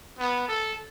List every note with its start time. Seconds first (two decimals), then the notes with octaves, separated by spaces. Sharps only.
0.18 B3
0.48 A4